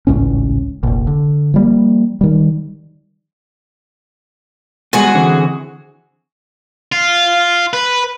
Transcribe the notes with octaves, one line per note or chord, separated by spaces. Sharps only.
G#1 C#2 A2 C#4
F1 A#1
D3
F3 G3 A#3
D#3 G3
G3 G#3 B3 F#4 G#4
D3 E3 C4
F4
B4